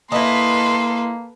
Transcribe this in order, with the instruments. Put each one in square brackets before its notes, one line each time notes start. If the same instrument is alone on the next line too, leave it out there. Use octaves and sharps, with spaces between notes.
[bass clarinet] A#3 [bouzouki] E4 D#5 [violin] A4 B4 [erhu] C6